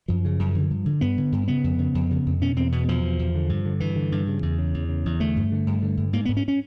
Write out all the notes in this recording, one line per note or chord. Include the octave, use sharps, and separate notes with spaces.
F#2 F3
C#3
F#2
D3
G2
D3
G2 B3
D3
G2
C#3 B3
F2
C#3
F2
C#3
F2
B2 C#4
E2 C4
B2 B3
E2 F3
B2
E2
D3
G2
D3
G2 E3
D3
G2
C#3
E2
C#3
E2
C#3
E2
D3 A3
G2
D3
G2
D3
G2
G#2 A#3
G#2 B3
C#4
C#4